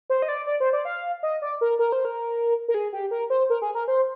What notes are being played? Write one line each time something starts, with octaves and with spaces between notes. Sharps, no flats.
C5
D#5
D5
D5
C5
D5
F5
D#5
D5
A#4
A#4
C5
A#4
A#4
G#4
G4
A#4
C5
A#4
G#4
A#4
C5